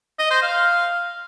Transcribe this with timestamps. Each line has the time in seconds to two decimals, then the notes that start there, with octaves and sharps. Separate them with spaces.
0.19 D#5
0.30 C5
0.42 F5